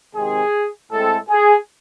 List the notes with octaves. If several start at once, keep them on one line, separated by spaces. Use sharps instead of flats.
C3 D#3 G#3 C4 G#4
A2 G#3 C4 A4
G#4